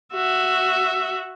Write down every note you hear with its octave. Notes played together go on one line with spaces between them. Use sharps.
F#4 E5